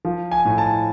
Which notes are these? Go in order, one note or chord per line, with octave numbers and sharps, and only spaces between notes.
F3
G#5
A2
A5